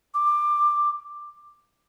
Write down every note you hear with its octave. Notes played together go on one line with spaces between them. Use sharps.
D6